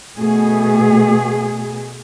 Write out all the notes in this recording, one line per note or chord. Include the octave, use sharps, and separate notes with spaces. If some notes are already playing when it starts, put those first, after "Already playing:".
B2 A3 G#4